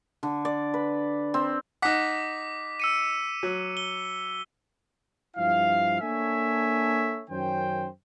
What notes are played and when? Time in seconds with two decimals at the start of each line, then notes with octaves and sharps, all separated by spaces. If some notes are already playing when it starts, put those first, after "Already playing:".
0.23 D3
0.45 D5
0.74 B4
1.34 C4
1.82 D#4 F#5 D6 B6
2.80 E6 C#7 D#7
3.43 F#3
3.77 G7
5.36 G2 F3 E4 F5
6.01 A#3 D4 A4 C#5 E5 G#5
7.30 F#2 D#3 C#4 C5 G5